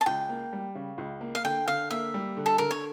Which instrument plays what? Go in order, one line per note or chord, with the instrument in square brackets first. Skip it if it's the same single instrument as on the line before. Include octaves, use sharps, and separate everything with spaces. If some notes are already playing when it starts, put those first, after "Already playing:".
[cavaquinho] A5
[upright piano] C#2 [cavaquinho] G5
[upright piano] A#3
G3
C#3
C#2
A#3
[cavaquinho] F5
[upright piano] D3 [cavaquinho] G5
[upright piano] D3 [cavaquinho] F5
[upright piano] A#3 [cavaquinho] E5
[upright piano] G3
D3
[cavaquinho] A4
[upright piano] D3 [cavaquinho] A#4
[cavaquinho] C#5